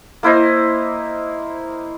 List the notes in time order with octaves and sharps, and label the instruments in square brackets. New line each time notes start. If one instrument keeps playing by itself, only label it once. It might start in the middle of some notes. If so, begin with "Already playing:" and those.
[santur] A#3 E4 C5 D#5